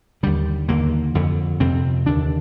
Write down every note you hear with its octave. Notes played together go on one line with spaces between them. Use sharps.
D#2 D3 G3
D#2 D3 A#3
F2 D3
F2 C3 C4
D#2 D3 D4